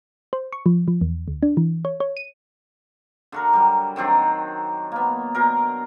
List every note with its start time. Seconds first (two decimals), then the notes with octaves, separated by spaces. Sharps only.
0.33 C5
0.53 C#6
0.66 F3
0.88 F3
1.01 E2
1.28 D2
1.43 D4
1.57 E3
1.85 C#5
2.00 C#5
2.17 D#7
3.32 D3 F#4 A#4
3.53 F#3 G3
3.96 D#3 F#3 C4 D4
4.92 A#3 B3
5.35 B2 A#4